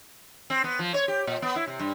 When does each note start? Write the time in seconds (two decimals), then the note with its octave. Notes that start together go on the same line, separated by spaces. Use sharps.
0.50 C4
0.64 B3
0.79 F3
0.94 C#5
1.08 G4
1.27 A#2
1.42 B3
1.56 E4
1.68 C3
1.79 G2